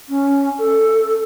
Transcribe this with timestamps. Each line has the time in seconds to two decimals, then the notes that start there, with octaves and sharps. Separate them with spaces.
0.09 C#4
0.58 A4